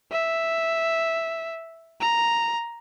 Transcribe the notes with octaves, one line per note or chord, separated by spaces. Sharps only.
E5
A#5